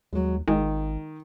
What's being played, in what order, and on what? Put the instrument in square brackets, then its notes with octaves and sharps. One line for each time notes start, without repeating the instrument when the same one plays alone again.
[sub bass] D#2 [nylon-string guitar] F#3 G#3
[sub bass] G#1 [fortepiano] D#3 [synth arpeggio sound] G#3 [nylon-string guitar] F4